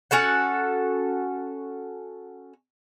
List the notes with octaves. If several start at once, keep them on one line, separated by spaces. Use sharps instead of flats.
C#4 F#4 A4 F#5